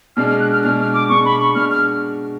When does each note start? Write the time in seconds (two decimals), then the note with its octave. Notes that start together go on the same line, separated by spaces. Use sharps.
0.17 B2 G#3 D4 F6
0.28 F6
0.40 F#6
0.52 F6
0.63 B2 G#3 D4 F6
0.78 F6
0.94 D6
1.09 B2 G#3 D4 C#6
1.25 B5
1.40 C#6
1.55 B2 G#3 D4 F6
1.71 F6